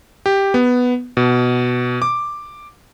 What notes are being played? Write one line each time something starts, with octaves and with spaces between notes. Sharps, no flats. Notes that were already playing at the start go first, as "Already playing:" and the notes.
G4
B3
B2
D6